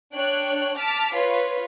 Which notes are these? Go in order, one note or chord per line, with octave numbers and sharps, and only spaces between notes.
D4 C#5 G5 F#6
A5 D6 F6 B6
F4 B4 C#5